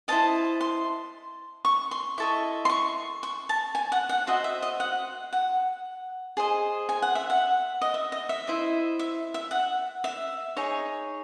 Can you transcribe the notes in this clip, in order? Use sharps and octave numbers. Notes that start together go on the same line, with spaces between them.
E4 C5 D#5 A5
C6
C#6
C6
E4 A4 D#5 C#6
C6
C#6
C#6
A5
G#5
F#5
F#5
F#4 C5 D#5 E5
E5
D#5
F#5
F#5
G#4 C5 D#5
G#5
F#5
E5
F#5
D#5
E5
D#5
E5
E4 C5 D#5
E5
E5
F#5
E5
D#4 G#4 C#5